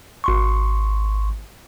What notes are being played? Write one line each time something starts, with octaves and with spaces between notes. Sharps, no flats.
G#1 C6 C#6